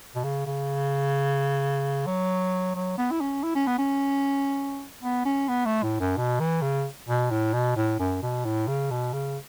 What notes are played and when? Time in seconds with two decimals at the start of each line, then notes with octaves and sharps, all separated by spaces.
0.15 B2
0.24 C#3
0.46 C#3
2.06 F#3
2.75 F#3
2.98 B3
3.11 E4
3.21 C#4
3.43 E4
3.55 C#4
3.67 B3
3.78 C#4
5.03 B3
5.25 C#4
5.48 B3
5.66 A3
5.83 A2
6.00 F#2
6.17 B2
6.40 E3
6.62 C#3
7.09 B2
7.31 A2
7.54 B2
7.76 A2
7.99 F#2
8.22 B2
8.45 A2
8.68 C#3
8.91 B2
9.13 C#3